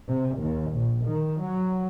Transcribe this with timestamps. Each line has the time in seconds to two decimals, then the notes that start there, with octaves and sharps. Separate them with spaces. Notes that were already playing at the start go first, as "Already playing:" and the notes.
0.10 C3
0.40 D#2
0.73 A#1
1.06 D#3
1.43 F#3